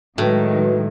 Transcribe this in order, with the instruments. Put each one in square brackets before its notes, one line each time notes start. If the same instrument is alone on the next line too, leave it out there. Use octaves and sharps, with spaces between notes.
[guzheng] A2 [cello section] D#3 F#3 G#3 [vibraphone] F#4 B4